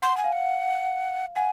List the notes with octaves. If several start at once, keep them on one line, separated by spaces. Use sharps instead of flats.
F#5 C6
G#5
F5
F#5
F#5 G#5